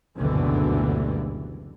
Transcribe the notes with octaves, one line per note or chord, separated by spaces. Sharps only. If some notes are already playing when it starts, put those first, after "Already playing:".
F#1 D2 G2 B2 D3 E3